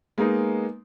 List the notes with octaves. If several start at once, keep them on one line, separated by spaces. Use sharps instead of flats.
G#3 A#3 B3 D#4